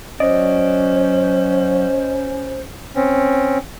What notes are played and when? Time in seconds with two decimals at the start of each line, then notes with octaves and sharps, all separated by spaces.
0.20 F#3 C#4 C5 D5 D#5
2.96 C4 C#4